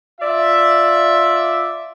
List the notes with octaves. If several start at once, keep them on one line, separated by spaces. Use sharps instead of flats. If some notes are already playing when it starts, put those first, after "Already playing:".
F4 D5 E5